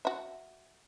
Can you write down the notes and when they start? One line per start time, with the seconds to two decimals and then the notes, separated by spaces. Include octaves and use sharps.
0.05 F#4 E5